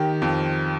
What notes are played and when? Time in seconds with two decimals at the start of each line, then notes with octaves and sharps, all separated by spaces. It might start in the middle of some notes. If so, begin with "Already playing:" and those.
Already playing: D#3 G4
0.22 F2